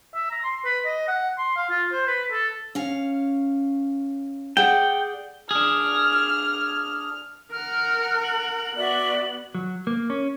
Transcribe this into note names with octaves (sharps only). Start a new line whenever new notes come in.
E5
A#5
C6
B4
D#5
F#5
C6
F5
F4
C5
B4
A4
C#4 F5
G#4 D5 F#5 G5
D4 G#4 F6
A#4 F#5 F6
F#7
B3 F#4 D5 E5
F#3
A#3
C#4